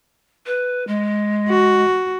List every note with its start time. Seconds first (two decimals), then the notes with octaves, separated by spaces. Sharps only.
0.46 B4
0.87 G#3
1.49 F#4